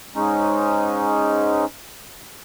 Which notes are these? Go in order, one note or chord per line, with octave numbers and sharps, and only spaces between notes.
G#2 G#3 C#4 D#4